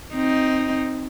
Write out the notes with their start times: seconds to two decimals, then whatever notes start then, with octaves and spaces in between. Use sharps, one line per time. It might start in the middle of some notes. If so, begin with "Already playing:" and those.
0.14 C4 D#4